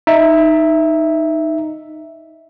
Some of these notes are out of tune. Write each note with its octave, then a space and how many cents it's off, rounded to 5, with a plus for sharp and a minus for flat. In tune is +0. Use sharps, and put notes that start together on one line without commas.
D#4 +0 E5 +0